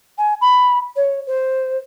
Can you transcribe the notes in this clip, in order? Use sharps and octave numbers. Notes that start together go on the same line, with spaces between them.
G#5
B5
C#5
C5